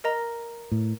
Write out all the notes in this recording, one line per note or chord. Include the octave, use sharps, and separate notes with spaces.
A#4 D#5 A#5
A2